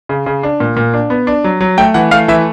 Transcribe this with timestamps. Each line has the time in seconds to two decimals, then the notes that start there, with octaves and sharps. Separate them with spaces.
0.09 C#3
0.26 C#3
0.43 D4
0.60 A#2
0.77 A#2
0.93 D4
1.10 B3
1.27 D4
1.44 F#3
1.61 F#3
1.78 A3 G5
1.94 E3 F#5
2.11 A3 F5
2.28 E3 E5